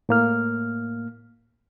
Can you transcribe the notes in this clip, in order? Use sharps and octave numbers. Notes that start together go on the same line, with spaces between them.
A2 A#3 F6